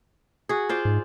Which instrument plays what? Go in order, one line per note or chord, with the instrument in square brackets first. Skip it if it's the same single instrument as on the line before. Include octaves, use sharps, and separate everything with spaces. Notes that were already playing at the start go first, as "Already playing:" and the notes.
[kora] F#4 G#4
F4 C5 D5
[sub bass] G#2